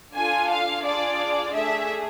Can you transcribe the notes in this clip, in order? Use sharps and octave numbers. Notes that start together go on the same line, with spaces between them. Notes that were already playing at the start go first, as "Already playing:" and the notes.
D4 F4 A4 G#5
F5
D4 F4 G#4 D5
A3 D4 G#4 E5